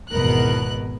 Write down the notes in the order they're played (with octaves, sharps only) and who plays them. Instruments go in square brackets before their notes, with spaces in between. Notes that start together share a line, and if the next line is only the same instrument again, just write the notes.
[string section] G#1 E2 B2 B3 A#4 F#6